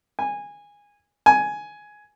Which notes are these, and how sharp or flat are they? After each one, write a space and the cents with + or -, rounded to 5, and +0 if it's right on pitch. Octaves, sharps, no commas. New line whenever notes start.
G#5 -15
G#5 +10